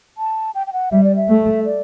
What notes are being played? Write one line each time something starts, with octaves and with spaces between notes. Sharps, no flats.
A5
G5
G5
F#5
G3 E5
D5
E5
A3
D5